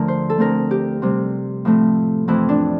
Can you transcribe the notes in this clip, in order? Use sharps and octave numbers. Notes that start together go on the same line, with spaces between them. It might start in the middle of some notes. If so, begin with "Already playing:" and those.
Already playing: D2 D3 F3 A3 A#4
C5
A4
D2 D3 A3 C4 A#4
G4
C3 G3 C4
A2 F3 A3 C4
F2 E3 A3 C4 E4
D4